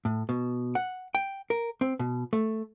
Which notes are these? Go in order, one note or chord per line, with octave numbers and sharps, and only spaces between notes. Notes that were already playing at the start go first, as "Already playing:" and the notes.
A2
B2
F#5
G5
A#4
C4
B2
A3